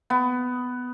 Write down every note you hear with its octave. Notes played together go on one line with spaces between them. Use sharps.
B3